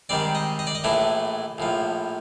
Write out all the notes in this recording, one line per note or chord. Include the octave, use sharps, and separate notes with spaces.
G#2 D#3 G3 C4 D5
D#5
D#5
D5
D#5
A#1 A2 E3 A3 D4
A#1 A2 F3